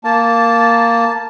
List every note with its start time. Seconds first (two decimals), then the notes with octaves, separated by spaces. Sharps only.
0.04 A#3 A5